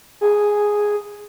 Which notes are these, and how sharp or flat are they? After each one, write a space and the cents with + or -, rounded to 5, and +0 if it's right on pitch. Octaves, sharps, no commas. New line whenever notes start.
G#4 +0